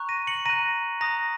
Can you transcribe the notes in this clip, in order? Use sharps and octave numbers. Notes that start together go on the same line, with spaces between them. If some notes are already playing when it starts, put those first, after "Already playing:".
Already playing: A#5 C#6 F#6
A#6 D#7
C#7 F#7
A#5 F#6 A#6 D#7
A#5 D#6 F#6 A#6